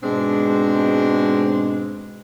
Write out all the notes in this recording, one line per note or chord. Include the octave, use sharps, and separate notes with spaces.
G#2 B2 G#3 C4 D4